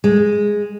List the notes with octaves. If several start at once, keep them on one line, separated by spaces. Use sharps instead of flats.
G#3